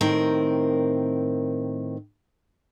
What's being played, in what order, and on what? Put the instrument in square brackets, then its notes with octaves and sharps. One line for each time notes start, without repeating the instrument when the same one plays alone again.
[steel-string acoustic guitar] A2 D#3 C4 A#4